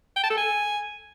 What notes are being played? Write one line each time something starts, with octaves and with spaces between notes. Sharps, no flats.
G5
A5
A4
G#5